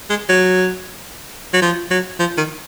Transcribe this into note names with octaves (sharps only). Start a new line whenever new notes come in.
G#3
F#3
F#3
F3
F#3
F3
D#3